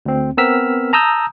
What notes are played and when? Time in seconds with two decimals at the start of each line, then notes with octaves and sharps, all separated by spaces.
0.06 D2 C4
0.37 B3 C4 A#4 E6 F6 B6
0.93 A5 A#5 D#6 E6 G6